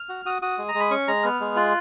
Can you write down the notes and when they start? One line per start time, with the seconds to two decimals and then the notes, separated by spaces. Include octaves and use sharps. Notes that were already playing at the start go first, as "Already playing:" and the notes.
Already playing: F6
0.09 F#4
0.25 F#4 D#6
0.42 F#4 D#6
0.58 G#3
0.69 A#5
0.75 G#3
0.80 B5
0.91 C#4 C#6
1.08 G#3 A#5
1.23 B3 F6
1.40 G#3
1.56 F4 F#6